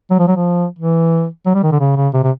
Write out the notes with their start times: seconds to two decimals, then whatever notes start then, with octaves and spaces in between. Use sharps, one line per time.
0.10 F#3
0.19 F3
0.27 F#3
0.36 F3
0.79 E3
1.46 F#3
1.55 G3
1.63 D#3
1.72 D3
1.80 C#3
1.96 C#3
2.13 C3
2.23 C3